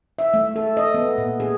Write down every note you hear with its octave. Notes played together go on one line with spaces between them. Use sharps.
E5
A3
A4
D#5
B3
A#2
G#4